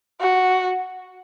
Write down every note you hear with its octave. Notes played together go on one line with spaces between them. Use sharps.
F#4